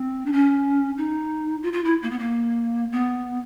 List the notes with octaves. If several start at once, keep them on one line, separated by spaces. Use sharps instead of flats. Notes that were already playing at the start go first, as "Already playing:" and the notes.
Already playing: C4
D4
C#4
D#4
F4
F4
E4
A#3
B3
A#3
B3